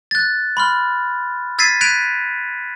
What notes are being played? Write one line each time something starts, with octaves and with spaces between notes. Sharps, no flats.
F#6 A6
B5 C6 F6
E6 G#6 A6 B6 C7 D#7
F#6 G#6 B6 D7 D#7 F7